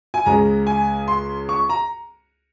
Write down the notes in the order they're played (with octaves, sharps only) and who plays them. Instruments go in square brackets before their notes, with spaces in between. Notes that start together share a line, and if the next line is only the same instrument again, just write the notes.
[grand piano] G#5
C#2 C#3 G#3 A#5
G#5
C6
C#6
A#5